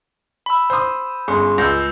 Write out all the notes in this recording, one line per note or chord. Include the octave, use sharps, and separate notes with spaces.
B5 E6
C5 D#6
G1 C#4 G#4 C6
C#2 E6 G6 A#6